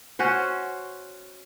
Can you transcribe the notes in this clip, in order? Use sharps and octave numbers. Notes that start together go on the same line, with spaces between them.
C#4 F#4 C5